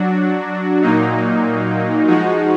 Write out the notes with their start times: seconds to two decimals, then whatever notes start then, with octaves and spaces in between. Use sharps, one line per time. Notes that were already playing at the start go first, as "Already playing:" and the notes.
Already playing: F#3 D4 F#4
0.82 A#2 F#3 A#3 D#4
2.08 F3 G#3 D#4 F#4